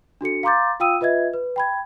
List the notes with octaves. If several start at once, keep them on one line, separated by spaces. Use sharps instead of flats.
D4 F#4 A4 C#7
F5 A#5 C6 D6 G6 A6
F4 F5 G5 D#6 E6 D#7
F4 B4 D#5 E5 G#6
B4
G5 B5 G#6